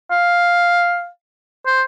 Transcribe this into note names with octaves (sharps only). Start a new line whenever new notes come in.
F5
C5